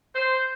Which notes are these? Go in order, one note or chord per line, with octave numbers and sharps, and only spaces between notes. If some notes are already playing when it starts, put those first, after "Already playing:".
C5